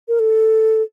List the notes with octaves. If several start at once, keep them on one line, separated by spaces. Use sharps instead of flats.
A#4
A4